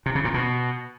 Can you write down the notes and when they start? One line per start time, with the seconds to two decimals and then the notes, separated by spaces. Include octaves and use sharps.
0.06 C3
0.15 C#3
0.25 A#2
0.34 B2